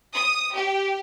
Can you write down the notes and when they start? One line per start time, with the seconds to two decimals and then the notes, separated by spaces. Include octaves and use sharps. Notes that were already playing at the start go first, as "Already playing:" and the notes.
0.15 D#6
0.55 G4